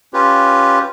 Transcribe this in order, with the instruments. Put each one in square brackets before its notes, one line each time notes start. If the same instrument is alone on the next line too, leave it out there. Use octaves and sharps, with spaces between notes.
[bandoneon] C#4 F4 G4 B4